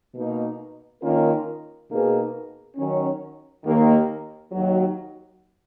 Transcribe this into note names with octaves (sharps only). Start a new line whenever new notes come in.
B2 A#3 D#4
D#3 A#3 C#4 F4 A#4
B2 A#3 D#4 G#4 B4
D#3 F#3 C#4
D#2 D#3 A#3
D#2 D#3 F#3